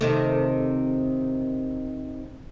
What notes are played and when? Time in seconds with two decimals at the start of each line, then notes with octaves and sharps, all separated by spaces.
0.01 C3 D#3 A3